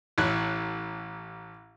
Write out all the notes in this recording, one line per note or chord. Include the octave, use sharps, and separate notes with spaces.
A1 E4 C#5 F#6